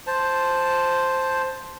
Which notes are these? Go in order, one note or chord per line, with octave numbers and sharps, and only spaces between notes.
C5 A5